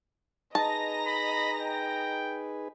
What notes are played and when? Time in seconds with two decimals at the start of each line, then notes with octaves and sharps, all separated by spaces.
0.55 D#4 G#4 B4 D#5 A5 A#5 A#6
1.07 B5
1.61 G5